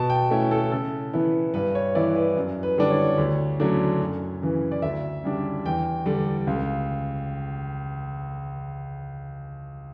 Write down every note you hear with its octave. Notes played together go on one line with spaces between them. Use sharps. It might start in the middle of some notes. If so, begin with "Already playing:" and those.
Already playing: B2 A5
G5
A3 C#4 E4
A4
C#3 A4
E3 B3 E4 B4
G2 B4
C#5
E3 B3 E4 D5
B4
F#2
B4
D3 G3 D4
C#5
D2
C#3 F#3 A3 D4
F#2
C#3 E3
D5
D2 E5
C#3 G3 D4
E2 G5
D3 G3
C#2